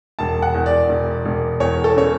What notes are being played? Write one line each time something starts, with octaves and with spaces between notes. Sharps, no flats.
E1 A5
F#5
E2
D5
E1
E1
E2 C#5
A4
C#3 C#5